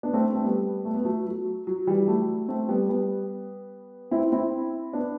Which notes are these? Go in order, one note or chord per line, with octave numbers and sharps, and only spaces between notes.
B3 D4
A3 C4
A3 C4
G3 B3
A3
B3
F#3 A3
F#3
F#3
E3 G3
F#3 A3
A3 C4
G3 B3
G3 B3
C4 E4
C4 E4
B3 D4